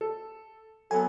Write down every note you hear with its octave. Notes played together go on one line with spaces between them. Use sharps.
A4
F#3 B3 A4 G#5